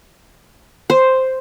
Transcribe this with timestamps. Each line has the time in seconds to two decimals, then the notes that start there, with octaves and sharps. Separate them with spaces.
0.90 C5